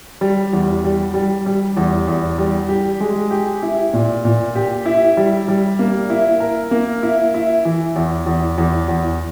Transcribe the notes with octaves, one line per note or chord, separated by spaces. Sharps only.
G3
E2
G3
G3
G3
E2
E2
G3
G4
G#3
G4
E4
A#2
A#2
G4
E4
G3
G3
A#3
E4
A#4
A#3
E4
E4
E3
E2
E2
E2
E2